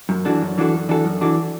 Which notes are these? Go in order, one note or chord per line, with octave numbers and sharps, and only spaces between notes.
F#2
E3 D4 F#4 A4
F#2
E3 D4 F#4 A4
F#2
E3 D4 F#4 A4
F#2
E3 D4 F#4 A4